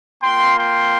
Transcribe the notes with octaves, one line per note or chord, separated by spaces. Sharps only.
A#3 F4 G5 C6
G5 C6